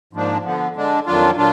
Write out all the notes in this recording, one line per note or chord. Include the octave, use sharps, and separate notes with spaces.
G#2 F3 A#3 D4
D3 F3 B3
D3 G#3 D4
F2 D#3 F#3 D4 F4
A#2 F#3 D4 F4